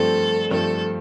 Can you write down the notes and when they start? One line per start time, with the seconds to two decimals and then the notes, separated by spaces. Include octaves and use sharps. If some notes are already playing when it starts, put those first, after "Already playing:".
Already playing: G2 F3 A3 C4 A4
0.51 G2 F3 A3 C4 A4